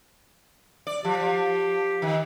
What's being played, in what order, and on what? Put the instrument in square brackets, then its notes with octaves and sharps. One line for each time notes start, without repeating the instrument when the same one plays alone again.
[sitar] D5
[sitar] F3 [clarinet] G4
[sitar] D#3